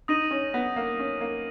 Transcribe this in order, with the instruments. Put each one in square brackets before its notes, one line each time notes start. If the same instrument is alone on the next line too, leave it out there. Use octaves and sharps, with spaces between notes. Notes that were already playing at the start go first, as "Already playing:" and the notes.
[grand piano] D#4 [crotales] D#6 A#6 D#7 F#7
[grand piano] C#4
B3
A#3
C#4
A#3